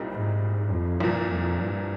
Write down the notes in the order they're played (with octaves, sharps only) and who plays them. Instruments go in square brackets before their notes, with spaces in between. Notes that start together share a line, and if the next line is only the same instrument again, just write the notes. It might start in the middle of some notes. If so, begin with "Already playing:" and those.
Already playing: [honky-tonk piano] C2 A#2 G3 C4 D#4
[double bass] G#2
F2
[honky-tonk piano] C2 A#2 F3 [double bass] G2
[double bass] F2
G2